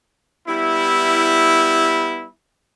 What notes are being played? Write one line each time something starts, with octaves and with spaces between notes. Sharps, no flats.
G3 B3 E4